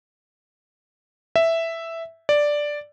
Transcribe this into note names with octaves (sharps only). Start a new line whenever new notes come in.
E5
D5